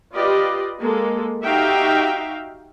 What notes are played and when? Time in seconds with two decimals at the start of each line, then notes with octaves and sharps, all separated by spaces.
0.15 F4 G4 B4 D5 D#5
0.80 G#3 A#3 A4
1.44 D#4 F#4 G4 E5 F5 G5